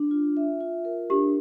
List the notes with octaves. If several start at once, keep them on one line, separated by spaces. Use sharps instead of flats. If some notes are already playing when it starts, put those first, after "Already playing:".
Already playing: D4
F4
E5
F4
A#4
D4 G4